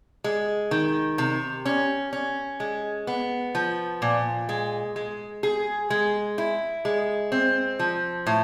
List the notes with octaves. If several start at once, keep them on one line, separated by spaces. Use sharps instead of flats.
G#3
D#3
C3
C#4
C#4
G#3
B3
F3
A#2
G#3
G#3
G#4
G#3
E4
G#3
C4
F3
A2